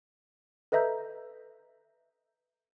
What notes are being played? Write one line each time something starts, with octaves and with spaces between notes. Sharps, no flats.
A4 B4 D#5 E5 A#5 G6